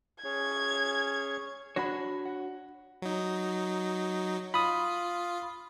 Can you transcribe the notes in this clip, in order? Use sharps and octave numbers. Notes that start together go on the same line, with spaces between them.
C#4 G#4 C#5 G#6
D4 F#4 C#5 B5 A#6
F#5
F#3 D#4
F4 B5 D#6